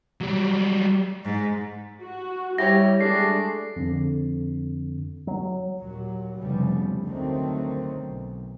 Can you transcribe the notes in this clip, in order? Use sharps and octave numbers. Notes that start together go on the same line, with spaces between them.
F#3 G3
G#2
F#4
G3 E4 G4 C#5 A#6
G#3 A3 D4 C7
F2 D3
F#3
D#2 A#2 F#3
F1 C#3 F3 G3 A3 B3
D2 D3 D#3 F#3 A3 C4
B1